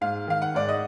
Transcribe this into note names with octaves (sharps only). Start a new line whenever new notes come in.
G#2 F5
D#3 F5
F#5
G#2 D5
D#5